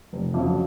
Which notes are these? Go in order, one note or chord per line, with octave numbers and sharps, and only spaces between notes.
F1
F2 C#3 F#3